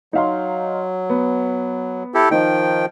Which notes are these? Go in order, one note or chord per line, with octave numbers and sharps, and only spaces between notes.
F#3 D#4 F5 C6
B3
E4 G4 A4
D#3 F3 D#4 G5